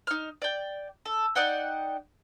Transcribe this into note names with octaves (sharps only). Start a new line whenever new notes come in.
D#4 F6
D5 G5
A4
D#4 D5 F#5 G5